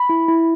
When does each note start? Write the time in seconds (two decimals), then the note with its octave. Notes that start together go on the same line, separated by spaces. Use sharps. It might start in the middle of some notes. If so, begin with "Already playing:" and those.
Already playing: B5
0.09 E4
0.28 E4